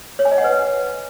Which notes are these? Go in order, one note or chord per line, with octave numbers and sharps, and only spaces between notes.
C#5
G#5
D#5
F#5
B4